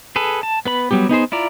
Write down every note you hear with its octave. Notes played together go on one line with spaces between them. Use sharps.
G#4 A4 B4
A5
B3 B4 B5
F#3 G3 B3 G4
B3 D#4 G#4 C5
E4 F4 D5 A#5